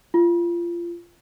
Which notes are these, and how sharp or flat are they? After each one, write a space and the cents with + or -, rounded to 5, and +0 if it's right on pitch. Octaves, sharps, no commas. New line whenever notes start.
F4 -25